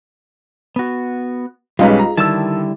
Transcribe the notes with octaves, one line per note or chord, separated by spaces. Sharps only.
B3 F#4
B1 G3 G#3 C#4 D#4 F4 B4
A#5
D3 D#3 G3 E4 A5 E6